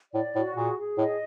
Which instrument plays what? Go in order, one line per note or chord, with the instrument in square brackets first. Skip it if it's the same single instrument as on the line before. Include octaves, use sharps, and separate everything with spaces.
[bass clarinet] A2 [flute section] D5
[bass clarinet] A2 [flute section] F#4
[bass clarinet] A#2 [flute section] G#4
[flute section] G#4
[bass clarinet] A2 [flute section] D#5